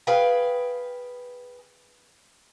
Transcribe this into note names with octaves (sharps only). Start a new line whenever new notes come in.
G#4 B4 F5 G5 G#5